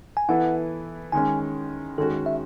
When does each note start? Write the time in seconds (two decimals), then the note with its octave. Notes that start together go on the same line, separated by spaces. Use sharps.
0.17 G#5
0.29 E3 B3 E4 A4 F#5
1.12 D#3 G#3 C#4 G#5
1.98 D#3 G#3 C#4 F#4 A4
2.26 E5